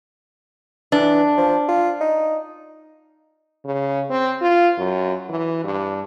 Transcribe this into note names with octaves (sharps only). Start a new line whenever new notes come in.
E3 D4
F3
F4
D#4
C#3
C4
F4
F#2
E3
G2